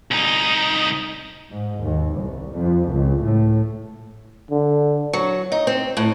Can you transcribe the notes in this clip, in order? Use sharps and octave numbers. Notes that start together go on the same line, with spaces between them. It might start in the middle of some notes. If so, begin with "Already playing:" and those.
C2 D#4
G#2
D#2
C2
F2
C#2
A2
D3
F#3
D#4
C4
A2